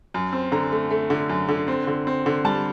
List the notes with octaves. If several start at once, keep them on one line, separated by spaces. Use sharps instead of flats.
F#2
C4
D3 A#5
A3
A3
D3
F#2
D3
C4
D3
C4
D3
G3 A5